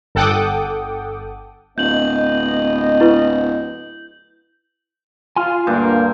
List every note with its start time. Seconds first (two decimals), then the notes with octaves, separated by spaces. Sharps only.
0.15 G1 A4 F#5 G5 D6 D#6
1.78 D1 B3 D#5 G6 F#7
3.01 E4 B4 C#6
5.36 F4 G#5 C6 F6
5.67 D2 G2 A#3